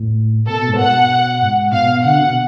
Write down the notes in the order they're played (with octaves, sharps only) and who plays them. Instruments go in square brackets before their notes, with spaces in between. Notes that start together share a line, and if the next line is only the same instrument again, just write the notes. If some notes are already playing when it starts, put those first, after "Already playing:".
Already playing: [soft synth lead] A2
[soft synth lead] B2 [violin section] A4
[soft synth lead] B2
G#2
[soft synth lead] B2 [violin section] F#5
[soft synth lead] G#2
[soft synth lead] B2 [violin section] F5
[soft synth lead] D3 [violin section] F#5
[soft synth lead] B2